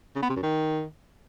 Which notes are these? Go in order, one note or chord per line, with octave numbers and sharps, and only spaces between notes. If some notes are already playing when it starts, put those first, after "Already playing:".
C#3
B3
C3
F#2
D#3